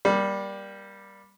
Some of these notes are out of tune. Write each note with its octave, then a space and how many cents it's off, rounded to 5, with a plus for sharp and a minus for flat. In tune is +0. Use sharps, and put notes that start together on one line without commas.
G3 +0 A#3 +25